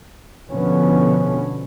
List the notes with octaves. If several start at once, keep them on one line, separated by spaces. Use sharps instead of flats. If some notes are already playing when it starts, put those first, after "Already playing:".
B2 D3 F3 B3 C#4